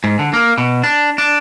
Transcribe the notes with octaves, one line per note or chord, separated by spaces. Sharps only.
G#2
D3
A#3
B2
D4
D4